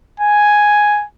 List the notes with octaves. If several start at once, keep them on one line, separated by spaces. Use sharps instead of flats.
G#5